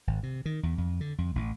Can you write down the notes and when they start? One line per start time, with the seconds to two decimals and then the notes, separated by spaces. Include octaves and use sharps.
0.07 G#1
0.23 C3
0.45 D#3
0.63 E2
0.78 F2
1.01 D3
1.18 F2
1.35 A1